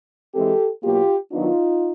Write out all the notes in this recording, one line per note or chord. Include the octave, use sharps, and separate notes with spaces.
E3 G#3 C4 G4 A4
B2 F#3 A#3 F4 G4
D#3 F#3 B3 D4 D#4 F4